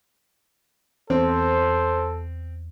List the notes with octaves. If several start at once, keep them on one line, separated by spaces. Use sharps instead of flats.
E2 C4 A4 C5